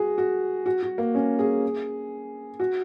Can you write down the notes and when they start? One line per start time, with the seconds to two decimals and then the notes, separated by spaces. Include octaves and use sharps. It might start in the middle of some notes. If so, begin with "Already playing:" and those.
Already playing: F#4 G#4
0.18 F#4
0.66 F#4
0.83 F#4
0.98 A#3
1.15 C#4
1.39 G#4
2.60 F#4